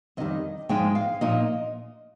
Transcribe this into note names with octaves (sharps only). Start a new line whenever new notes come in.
F2 D#3 G3 D#5
G#2 F3 G#3 D#4 G5
F5
A#2 F3 A#3 D#4 D#5